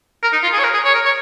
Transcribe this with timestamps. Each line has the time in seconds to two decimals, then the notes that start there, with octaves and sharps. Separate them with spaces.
0.23 A#4
0.33 D#4
0.43 F4
0.53 G#4
0.59 C#5
0.64 A#4
0.74 G#4
0.85 C#5
0.94 A#4
1.05 C#5